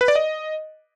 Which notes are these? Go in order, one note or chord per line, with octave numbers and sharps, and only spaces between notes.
B4
D5
D#5